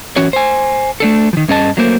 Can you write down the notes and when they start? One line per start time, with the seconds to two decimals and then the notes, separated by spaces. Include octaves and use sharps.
0.16 E3 C#4 F#4 C#5
0.33 C5 G#5
1.00 A3 D4 A4
1.33 D#3 F3
1.48 G2 C#4 G#4 D#5 A5
1.77 F#3 A3 A#3 A#4 C5